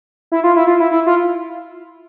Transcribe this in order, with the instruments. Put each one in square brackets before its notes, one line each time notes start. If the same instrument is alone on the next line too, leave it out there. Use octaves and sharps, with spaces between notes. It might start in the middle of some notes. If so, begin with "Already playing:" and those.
[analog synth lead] E4
F4
E4
F4
E4
E4
F4